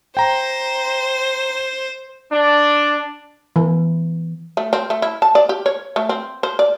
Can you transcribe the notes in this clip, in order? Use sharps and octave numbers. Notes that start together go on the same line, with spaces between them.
C5 G5 A#5
D4
E3
A3
C4
A3
E4
A5
D5
G4
C#5
A3
C4
C5
D5